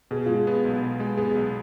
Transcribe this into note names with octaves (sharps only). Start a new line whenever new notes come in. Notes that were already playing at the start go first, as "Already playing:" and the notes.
B2 G#4
G#3 F4
G#4
B3
B1
B2
G#3
B3 G#4
B1